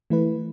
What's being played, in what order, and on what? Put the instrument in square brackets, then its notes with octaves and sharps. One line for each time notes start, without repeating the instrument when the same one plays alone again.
[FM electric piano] E3 A3 E4 B4